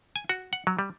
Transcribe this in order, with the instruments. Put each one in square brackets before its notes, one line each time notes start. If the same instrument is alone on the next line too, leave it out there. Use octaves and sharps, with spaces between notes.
[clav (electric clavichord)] G#5
F#4
F#5
F#3
G3